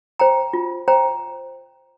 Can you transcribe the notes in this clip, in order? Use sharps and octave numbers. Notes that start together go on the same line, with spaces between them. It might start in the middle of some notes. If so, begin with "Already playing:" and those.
C5 G5 A#5
F4
C5 G5 A#5